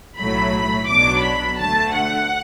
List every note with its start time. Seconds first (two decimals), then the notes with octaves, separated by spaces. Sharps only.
0.18 B1 A2 F#3 A3 B5
0.88 B1 B2 F#3 D4 D6
1.23 B5
1.58 D2 D3 A3 A5
1.93 F#5